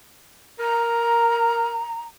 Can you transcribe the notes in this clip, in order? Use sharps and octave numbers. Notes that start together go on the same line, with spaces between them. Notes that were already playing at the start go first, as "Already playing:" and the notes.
A#4 A#5